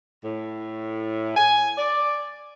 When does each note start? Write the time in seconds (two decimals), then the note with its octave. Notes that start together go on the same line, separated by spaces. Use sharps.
0.23 A2
1.36 G#5
1.78 D5